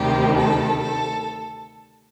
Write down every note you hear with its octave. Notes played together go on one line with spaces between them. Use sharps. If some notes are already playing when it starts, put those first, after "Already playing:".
Already playing: D2 C3 D#3 G3 G4
A4
A4